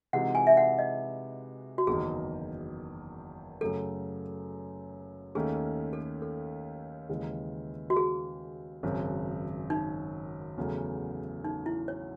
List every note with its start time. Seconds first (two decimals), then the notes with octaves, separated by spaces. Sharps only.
0.13 C3 E3 G#3 D#4 F#4 F#5
0.35 G#5
0.47 E5
0.57 F#5
0.79 D#5
1.78 F#4
1.87 F#1 E2 D#3 G#4
3.61 F#2 C#3 F#3 A3 A4
5.35 D#2 D#3 A3 C#4 G#4
5.93 A4
6.22 A4
7.09 D#2 C#3 E3 G#3
7.90 F#4
7.97 G#4
8.83 G#1 F#2 C#3 F#3
9.70 D#4
10.57 E2 C#3 F#3 A3
11.44 D#4
11.66 E4
11.88 C#5